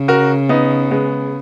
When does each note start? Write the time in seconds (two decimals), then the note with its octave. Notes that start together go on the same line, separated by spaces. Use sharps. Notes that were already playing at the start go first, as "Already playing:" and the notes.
Already playing: C#3
0.08 F#4 A#4
0.49 B3 D#4
0.91 G#3 B3